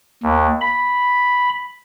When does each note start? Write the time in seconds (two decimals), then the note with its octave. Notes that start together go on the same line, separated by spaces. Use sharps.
0.23 D#2
0.61 B5